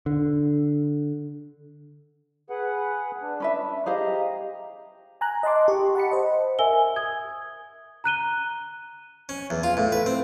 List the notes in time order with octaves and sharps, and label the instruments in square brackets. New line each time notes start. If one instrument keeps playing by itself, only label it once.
[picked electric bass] D3
[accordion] G#4 B4 F#5
D4
[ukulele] C#4 B4 E5
[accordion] G4 D#5 A#5 [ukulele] G#4 C5 F5
[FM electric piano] G#5 A#5 F#6
D#5 A5 C6 D6
G4 C#6
F#5 A5 B5 C#7
C5 D#5
[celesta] A#4 E5 G#5 E6 G7
D#6 G#6
A#5 F#6 D#7 G7
[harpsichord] C#4
E2
F4
A2
B4
C4